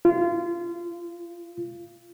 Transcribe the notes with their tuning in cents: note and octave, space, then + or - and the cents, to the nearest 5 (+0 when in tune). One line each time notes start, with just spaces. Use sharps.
F4 -25